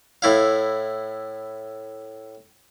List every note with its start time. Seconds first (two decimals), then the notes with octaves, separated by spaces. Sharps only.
0.22 A2 E4 F5